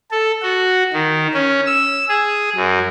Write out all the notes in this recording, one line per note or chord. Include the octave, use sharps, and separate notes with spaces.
A4
F#4
D#3
C#4
E6
G#4
F#2